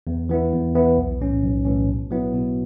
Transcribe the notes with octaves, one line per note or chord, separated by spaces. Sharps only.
E2
E3 B3 E4
E2
E3 B3 E4
B1
A2 E3 C#4
B1
A2 E3 C#4
B2
F#3 B3 E4
B2